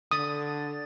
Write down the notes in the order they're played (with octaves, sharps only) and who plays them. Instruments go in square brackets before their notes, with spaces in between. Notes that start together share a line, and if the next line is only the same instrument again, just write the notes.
[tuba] D3 [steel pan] D#6 [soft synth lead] A6